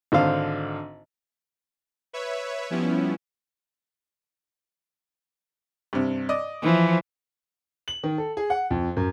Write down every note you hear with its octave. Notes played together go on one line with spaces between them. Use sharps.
G#1 D3 C5 F5
B4 C#5 E5
F3 G3 B3 C#4 E4
G2 C3
D5 D#5
E3 F3
F#7
D#3
A4
G#4
F#5
F2
F#2